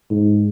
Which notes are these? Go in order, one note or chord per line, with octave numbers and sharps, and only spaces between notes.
G#2